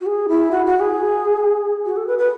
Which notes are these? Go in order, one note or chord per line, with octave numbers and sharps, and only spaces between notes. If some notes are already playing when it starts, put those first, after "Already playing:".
F#4
G#4
E4
F#4
F#4
G#4
F#4
A4
B4
B4